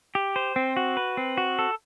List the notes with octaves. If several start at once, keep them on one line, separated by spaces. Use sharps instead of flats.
G4
C5
C4
F#4
B4
C4
F#4
A4